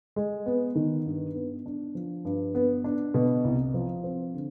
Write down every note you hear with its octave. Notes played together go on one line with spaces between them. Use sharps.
G#3
B3
D#3
G2
B3
D4
F3
G2
B3
D4
B2
C2
F3
C4
D3